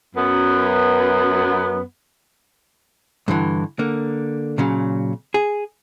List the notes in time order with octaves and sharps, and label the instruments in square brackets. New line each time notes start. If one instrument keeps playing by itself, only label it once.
[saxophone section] F#2 B3
[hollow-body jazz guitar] G2 D3 E3
D3 A#3
A#2 C#3 F#3
G#4